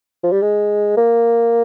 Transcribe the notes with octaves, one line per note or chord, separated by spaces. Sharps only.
F3
G3
G#3
A#3